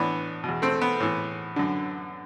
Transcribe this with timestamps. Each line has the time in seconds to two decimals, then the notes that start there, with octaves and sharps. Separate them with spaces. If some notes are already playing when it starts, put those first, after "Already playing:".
Already playing: A2 E3 B3 D4
0.44 E2 B2
0.62 A3 C4
0.82 B3
1.00 A2 E3
1.56 F#2 D3